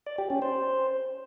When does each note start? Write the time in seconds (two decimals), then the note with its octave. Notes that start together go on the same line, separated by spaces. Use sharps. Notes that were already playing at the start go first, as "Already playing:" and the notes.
0.06 D5
0.18 G4
0.30 C#4
0.42 C5